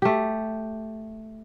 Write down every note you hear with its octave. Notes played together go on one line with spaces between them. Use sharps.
A3 G4